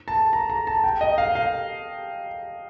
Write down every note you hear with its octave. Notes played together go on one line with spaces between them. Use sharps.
A5
A#5
A#5
A5
G5
D#5
F5
F5